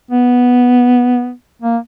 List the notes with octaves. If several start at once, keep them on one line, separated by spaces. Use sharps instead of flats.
B3
A#3